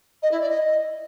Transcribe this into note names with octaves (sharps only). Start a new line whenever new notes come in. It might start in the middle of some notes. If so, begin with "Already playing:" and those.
D#5
E4
D5
D#5